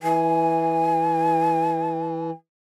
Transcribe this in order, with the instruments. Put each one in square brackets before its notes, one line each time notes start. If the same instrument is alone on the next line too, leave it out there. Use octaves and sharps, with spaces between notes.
[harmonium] E3 [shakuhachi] G#5